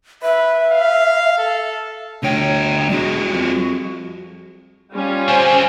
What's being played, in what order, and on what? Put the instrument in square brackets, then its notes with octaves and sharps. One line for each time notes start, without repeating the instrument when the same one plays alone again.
[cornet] B4 [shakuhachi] E5
[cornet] F5
A4
[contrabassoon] D2 [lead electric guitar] D3 G5 [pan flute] C#5
[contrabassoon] E1 [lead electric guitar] G3 G#4 [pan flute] F#4
[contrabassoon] F2
[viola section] G3 C#4 F4
[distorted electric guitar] D3 C4 [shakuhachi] C5 [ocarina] G#5